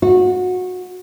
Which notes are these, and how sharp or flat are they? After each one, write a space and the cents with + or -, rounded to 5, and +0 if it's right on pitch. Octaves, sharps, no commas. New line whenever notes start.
F#4 -20